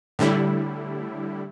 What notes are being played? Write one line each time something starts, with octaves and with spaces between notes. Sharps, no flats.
A2 D3 G3 E4